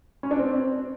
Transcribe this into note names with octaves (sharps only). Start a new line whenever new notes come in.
C#4
D4
C4